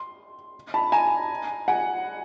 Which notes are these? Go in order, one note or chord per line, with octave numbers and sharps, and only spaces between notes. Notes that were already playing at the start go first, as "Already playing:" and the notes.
Already playing: C6
A5 B5
G#5 A#5
F#5 G#5